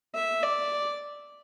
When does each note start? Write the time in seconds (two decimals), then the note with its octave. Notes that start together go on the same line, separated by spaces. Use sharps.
0.14 E5
0.43 D5